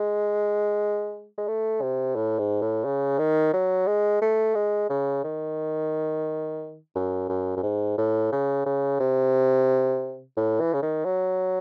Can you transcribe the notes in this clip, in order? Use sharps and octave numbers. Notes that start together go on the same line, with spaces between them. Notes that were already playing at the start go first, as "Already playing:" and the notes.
Already playing: G#3
G#3
A3
C3
A2
G#2
A2
C#3
D#3
F#3
G#3
A3
G#3
C#3
D#3
F#2
F#2
F#2
G#2
A2
C#3
C#3
C3
A2
E3
C#3
D#3
F#3